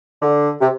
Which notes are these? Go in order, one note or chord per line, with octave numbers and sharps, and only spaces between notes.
D3
C3